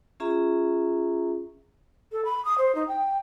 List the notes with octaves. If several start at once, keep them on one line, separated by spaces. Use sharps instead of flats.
C#4 F4 G#4 E5 A#5
A4
B5
D#6
C5
D#4
G5